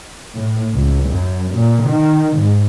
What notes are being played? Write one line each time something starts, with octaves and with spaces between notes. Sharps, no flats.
A2
C#2
F#2
A#2
D#3
G#2